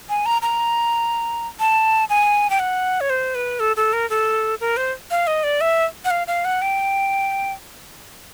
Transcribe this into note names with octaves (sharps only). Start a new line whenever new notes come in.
G#5
A#5
A#5
A5
G#5
G5
F#5
C#5
C5
B4
A4
A4
A#4
A4
A#4
C5
F5
D#5
D5
E5
F#5
F5
F5
F#5
G5